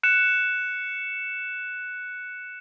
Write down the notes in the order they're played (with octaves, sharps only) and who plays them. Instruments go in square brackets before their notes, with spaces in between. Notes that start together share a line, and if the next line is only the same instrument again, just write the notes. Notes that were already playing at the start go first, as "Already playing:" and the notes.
[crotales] F#6 C#7 E7